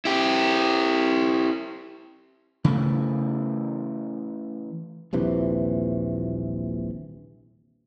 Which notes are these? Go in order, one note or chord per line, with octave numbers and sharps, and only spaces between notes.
E4 G4
C#3 E3 A3
D#1 A#1 C3 E3